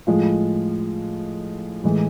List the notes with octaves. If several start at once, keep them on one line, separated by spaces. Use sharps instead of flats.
A2 F3 G#3 F4
A2 E3 G#3